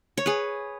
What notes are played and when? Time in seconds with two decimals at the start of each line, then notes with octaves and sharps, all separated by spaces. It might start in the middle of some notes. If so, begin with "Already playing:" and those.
0.17 C#5
0.26 G#4 B4